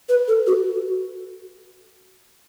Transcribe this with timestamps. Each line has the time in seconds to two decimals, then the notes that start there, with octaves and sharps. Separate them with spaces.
0.09 B4
0.28 A4
0.47 F#4